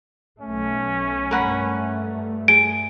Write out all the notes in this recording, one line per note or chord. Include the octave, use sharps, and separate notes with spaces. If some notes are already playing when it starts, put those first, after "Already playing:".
B1 A3 C#4
G2 A3 A#4 F#5 B5
G#4 D7